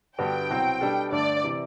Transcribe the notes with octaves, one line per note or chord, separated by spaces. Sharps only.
G2 D3 G3 B3 F#4 G5
C2 B2 F#3 C4 F#4
B2 G3 D4 A4
G2 D3 A3 D5
C3 E3